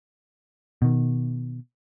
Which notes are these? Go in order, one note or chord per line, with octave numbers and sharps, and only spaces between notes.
B2 D#3